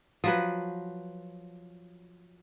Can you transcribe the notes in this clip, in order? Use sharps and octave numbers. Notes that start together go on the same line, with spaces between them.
F3 F#3 B4